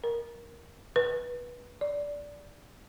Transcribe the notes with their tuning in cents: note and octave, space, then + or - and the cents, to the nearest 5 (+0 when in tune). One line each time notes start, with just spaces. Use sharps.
A#4 +10
B4 -20
D5 -10